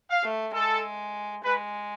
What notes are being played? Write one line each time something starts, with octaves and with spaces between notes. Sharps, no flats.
F5
A3
G#3 A4
G#3 B4